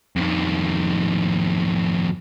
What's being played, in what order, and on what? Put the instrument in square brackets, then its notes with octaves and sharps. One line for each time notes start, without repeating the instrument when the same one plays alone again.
[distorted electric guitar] F2 D#3